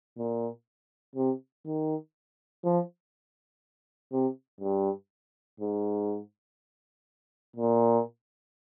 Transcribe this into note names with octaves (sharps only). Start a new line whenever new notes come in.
A#2
C3
D#3
F3
C3
G2
G#2
A#2